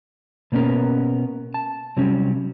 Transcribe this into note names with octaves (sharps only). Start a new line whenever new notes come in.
B2 A#3 B3 C#4 A#4
A5
C3 F#3 G3 C#4